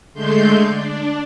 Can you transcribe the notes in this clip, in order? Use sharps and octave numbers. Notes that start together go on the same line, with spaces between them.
D3 G#3 A3 C6 G6
D4